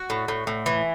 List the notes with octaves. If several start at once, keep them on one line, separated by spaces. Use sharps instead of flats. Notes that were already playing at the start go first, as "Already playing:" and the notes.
Already playing: F#4
A2
A2
A2
E3